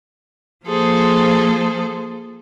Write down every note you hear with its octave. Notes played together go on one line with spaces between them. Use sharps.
F3 A#3 F4 G#4 A4 C5